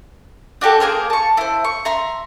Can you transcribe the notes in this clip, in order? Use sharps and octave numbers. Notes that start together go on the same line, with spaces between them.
D4 F#4 G4 A4
A#3 G#4 A#4 C5
A5 C#6
E4 C5
C#6
E5 A#5 C6